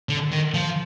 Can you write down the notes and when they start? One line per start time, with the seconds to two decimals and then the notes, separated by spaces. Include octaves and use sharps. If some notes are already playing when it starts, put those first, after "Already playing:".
0.09 D3
0.32 D#3
0.54 F3